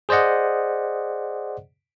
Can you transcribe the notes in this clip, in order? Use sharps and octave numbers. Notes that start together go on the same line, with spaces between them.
G#4 C5 D5 D#5 F#5